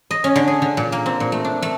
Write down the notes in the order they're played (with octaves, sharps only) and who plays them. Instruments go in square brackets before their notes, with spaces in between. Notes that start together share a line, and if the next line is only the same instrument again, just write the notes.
[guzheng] D#5
C#4
D3
G#4
D3
A#2
A#3
C4
A#2
A3
D4
A3